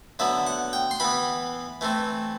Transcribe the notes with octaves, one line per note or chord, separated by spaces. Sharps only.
D3 F#3 B3 E5
F#5
G5
C6
E3 B3 B5
E3 A3 C4